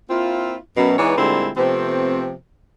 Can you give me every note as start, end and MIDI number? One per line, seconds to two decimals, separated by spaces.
0.10 0.57 58
0.10 0.57 60
0.10 0.57 64
0.10 0.57 65
0.77 0.97 42
0.77 0.97 47
0.98 1.16 52
0.98 1.16 56
0.98 1.16 59
0.98 1.16 63
0.98 1.16 73
0.98 1.16 74
1.18 1.50 46
1.18 1.50 50
1.18 1.50 55
1.18 1.50 56
1.18 1.50 60
1.18 1.50 64
1.57 2.34 48
1.57 2.34 53
1.57 2.34 57
1.57 2.34 59
1.57 2.34 60